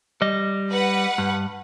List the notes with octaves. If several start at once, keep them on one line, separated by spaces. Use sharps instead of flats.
G3 D#5
B4 F#5
G2